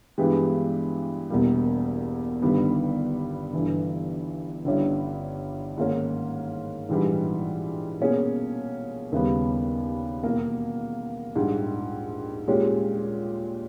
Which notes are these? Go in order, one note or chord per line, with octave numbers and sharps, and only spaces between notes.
G2 E3 G#3 B3 G4
E1 E2 B2 G3 A#3
G1 G2 D#3 G3 B3
G1 G2 E3
G1 G2 G3 C#4 E4
G#2 D#3 A#3 C#4
A#1 G#2 E3 G3
B2 A#3 C#4 G#4
D#2 C#3 G3 B3
E2 B2 A#3
A#1 G#2 G3
A#2 G#3 C#4 G4